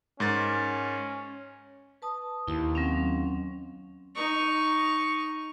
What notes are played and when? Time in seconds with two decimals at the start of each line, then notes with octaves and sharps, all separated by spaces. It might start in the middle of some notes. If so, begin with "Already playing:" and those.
0.20 G#2 C#4 A#4 A6
2.02 B4 A5 D#6
2.48 D#2 E4
2.75 F#3 C4 C#4
4.15 D#4 C#6